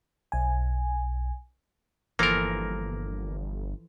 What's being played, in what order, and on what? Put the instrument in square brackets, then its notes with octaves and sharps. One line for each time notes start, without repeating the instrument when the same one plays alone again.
[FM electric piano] B1 G#5
[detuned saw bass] G1 [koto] E3 F3 A4 [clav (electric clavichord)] A#3 A#4